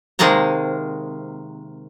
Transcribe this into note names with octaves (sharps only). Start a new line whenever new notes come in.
C3 D#3 G#3 A#3 A5 A#5